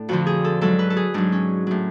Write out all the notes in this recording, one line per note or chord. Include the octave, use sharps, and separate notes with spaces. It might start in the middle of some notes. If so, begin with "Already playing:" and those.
Already playing: A2 D4
F2 D3 F3 F#4
G#4
A4
G#2 F#3 A4
B4
A4
G#4
G#2 F#3 D4
C#4
A2 F#3